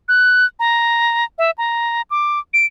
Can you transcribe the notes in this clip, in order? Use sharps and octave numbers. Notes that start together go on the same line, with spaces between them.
F#6
A#5
E5
A#5
D6
D7